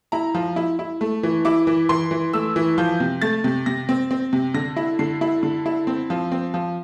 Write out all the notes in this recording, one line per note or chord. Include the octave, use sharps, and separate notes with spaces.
E4 A#5
F3
E4
E4
A3
E3
E4 D6
E3
E3 C6
E3
A3 E6
E3
F3 G6
C3
A3 A6
C3
C3 A#6
C4
C4
C3
D3 A#6
E4
D3 C7
E4
D3
E4
C4
F3
C4
F3